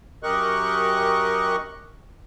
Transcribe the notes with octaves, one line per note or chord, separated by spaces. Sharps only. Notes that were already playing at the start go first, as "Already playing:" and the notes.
F#2 G4 A#4 D#5 C#6 F#6